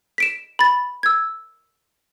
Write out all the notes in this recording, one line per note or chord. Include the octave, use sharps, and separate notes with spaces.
B6 D7 E7
B5 A6
E6 G#6